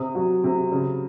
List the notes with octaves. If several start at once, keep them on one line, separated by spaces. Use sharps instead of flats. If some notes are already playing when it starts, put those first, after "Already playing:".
Already playing: C3 D#6
F#3
C3
C#3